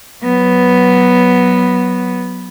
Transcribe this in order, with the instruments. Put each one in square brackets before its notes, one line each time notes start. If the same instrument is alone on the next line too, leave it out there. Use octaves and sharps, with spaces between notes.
[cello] F#3 B3